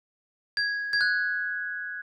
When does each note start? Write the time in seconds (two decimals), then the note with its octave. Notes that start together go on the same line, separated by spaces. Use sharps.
0.57 G#6
0.93 G#6
1.01 F#6